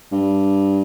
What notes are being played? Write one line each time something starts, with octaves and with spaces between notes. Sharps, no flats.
G2